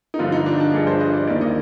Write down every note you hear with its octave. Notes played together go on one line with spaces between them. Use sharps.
D#4
G2 D3 F3 F4
D#4
D4
D4
G2 F3 G#4
C5
D#5
D5
D#2 D#3 D5
D#5